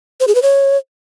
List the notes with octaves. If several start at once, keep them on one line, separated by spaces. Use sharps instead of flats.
C5
G#4
B4
C#5